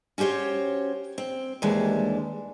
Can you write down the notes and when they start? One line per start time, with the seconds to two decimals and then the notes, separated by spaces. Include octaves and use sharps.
0.18 C#4 F#4 G4 C5 C#5
1.18 C4
1.62 D#2 E3 G3 G#3 D4